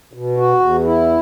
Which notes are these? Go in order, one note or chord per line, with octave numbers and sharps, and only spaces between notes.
B2
F#4
E2
E4